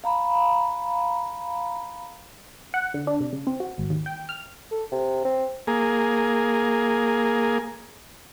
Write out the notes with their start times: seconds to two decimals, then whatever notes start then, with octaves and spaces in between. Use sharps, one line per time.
0.04 F5 A#5 B5
2.74 F#5
2.94 D3
3.07 D4
3.20 C3
3.33 C#3
3.47 C4
3.60 F#4
3.78 G#1
3.90 D#2
4.06 G5
4.29 F6
4.71 A4
4.92 C3
5.25 C4
5.67 A#3 G#4